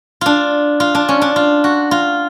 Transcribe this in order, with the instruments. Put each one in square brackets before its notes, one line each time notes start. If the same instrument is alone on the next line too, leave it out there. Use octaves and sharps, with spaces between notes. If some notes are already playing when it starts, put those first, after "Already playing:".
[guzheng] D4 F4
F4
D4
C#4
D4
F4
F#4
F4